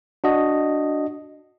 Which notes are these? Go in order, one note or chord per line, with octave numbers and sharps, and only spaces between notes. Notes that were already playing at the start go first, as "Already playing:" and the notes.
D4 F#4 D#5